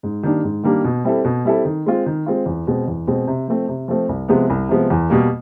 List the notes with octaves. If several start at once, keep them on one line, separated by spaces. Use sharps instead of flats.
G#2
D#3 G3 A#3 D4
G#2
D#3 G3 A#3 D4
B2
G3 C4 E4 A4
B2
G3 C4 E4 A4
D#3
G#3 C4 F4
D#3
G#3 C4 F4
E2
B2 G#3 C4
E2
B2 G#3 C4
C3
F3 A3 C4
C3
F3 A3 C4
C2
C3 F3 G#3 B3
C2
C3 F3 G#3 B3
E2
B2 G3 A#3